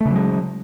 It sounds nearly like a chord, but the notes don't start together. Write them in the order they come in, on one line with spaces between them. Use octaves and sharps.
A3 C#3 F#3 G#3